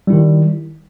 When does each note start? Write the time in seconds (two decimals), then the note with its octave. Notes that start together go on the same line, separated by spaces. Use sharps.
0.07 G3
0.10 E4
0.13 D#3